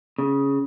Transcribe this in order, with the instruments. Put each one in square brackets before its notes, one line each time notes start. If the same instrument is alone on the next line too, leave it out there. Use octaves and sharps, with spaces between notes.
[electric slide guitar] C#3